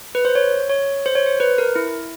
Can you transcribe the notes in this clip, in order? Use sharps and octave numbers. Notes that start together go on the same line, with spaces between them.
B4
C5
C#5
C#5
C5
C#5
C5
B4
A#4
E4